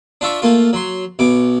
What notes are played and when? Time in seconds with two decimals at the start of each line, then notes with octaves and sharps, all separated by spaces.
0.21 D4 F4 E5 C#6
0.42 A3 A#3 F4
0.73 F#3 C6
1.19 B1 B2 D6